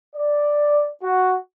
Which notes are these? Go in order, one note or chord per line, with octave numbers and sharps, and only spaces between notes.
D5
F#4